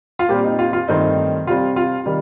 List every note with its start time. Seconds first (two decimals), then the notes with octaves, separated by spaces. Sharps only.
0.19 F4
0.29 A#2 G3 C4 G4
0.44 D#4
0.59 F4
0.73 F4
0.88 G2 D#3 A3 C4 D#4
1.47 C3 G3 C4 F4
1.76 F4
2.06 C3 D#3 G3